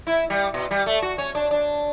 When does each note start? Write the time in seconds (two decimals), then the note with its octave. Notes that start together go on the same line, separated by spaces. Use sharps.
0.07 E4
0.30 G3
0.54 B2
0.71 G3
0.86 A3
1.02 F#4
1.18 C#4
1.35 D4
1.51 D4